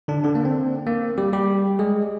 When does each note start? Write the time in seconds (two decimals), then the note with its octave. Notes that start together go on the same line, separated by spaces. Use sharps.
0.08 D3 D4
0.24 D3 D4
0.35 A#3
0.45 C4
0.86 A#3
1.18 G3 G4
1.33 G3 G4
1.79 G#3 G#4